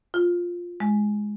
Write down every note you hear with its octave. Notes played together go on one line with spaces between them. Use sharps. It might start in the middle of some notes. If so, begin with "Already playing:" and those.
F4
G#3